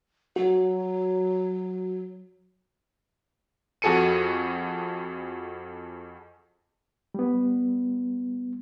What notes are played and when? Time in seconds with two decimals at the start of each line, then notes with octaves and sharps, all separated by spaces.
0.36 F#3 F#4
3.82 F2 F#4 G#4 A4 C#7 D#7
7.14 G3 B3